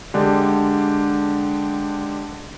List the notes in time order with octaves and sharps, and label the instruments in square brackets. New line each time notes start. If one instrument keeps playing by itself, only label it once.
[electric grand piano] D3 G#3 D4 G4